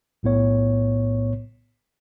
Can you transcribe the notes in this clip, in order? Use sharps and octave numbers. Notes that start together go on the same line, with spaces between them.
B1 A2 B3 C#5